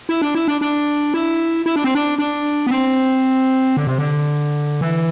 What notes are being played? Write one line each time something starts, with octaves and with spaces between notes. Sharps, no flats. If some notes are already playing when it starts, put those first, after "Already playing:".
E4
D4
E4
D4
D4
E4
E4
D4
C4
D4
D4
B3
C4
D3
C3
D3
E3